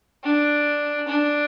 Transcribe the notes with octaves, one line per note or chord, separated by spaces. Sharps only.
D4
D4